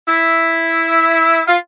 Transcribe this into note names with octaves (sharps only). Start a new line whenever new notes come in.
E4
F4